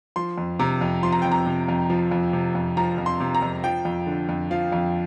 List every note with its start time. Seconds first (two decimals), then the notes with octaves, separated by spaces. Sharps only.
0.16 F3 C6
0.38 F2
0.59 C3 A#5
0.81 F2
1.03 F3 C6
1.12 A#5
1.22 F2 G5
1.32 A#5
1.46 C3
1.68 F2
1.90 F3
2.11 F2
2.33 C3
2.55 F2
2.77 F3 A#5
2.98 F2
3.06 C6
3.20 C3
3.35 A#5
3.42 F2
3.64 F3 G5
3.85 F2
4.07 D3
4.29 F2
4.51 F3 F5
4.72 F2